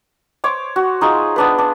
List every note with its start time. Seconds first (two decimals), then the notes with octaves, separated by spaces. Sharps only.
0.44 C5 C#5 D6
0.76 F#4
1.01 D#4 F4 G#4
1.36 B3 D4 B4
1.58 D4